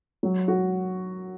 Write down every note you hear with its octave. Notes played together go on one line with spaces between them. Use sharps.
F#3
F#4